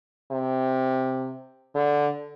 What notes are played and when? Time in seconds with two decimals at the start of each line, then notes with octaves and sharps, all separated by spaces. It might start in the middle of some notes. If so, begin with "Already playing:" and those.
0.31 C3
1.75 D3